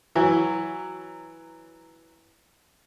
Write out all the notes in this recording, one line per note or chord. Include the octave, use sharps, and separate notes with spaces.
E3 F#3